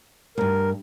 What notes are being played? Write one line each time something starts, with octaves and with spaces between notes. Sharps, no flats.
D2 G2 A#4